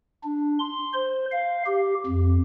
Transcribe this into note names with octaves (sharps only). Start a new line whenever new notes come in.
D4
C6
C5
F5
G4
F2